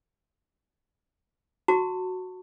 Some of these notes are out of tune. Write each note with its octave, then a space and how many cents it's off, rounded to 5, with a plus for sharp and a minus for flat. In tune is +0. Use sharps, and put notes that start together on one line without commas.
F#4 -5 A5 +30 C#6 +0